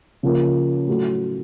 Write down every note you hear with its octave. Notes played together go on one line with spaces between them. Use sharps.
C#3 F3 A#3
A2 F#3 A3